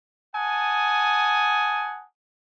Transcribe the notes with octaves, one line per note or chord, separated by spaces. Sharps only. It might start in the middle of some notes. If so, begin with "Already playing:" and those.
F#5 G#5 A5 D#6